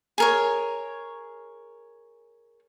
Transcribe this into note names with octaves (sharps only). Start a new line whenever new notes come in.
G#4 A#4 C#5